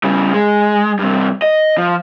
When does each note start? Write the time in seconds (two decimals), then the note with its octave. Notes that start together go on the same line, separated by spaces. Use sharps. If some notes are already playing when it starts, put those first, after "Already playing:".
0.04 C#3 G3
0.34 G#3
0.99 G2 C3
1.42 D#5
1.78 F3